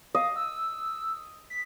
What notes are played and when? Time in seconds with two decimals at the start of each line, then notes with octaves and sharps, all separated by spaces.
0.15 D#5 F5
0.36 E6
1.50 B6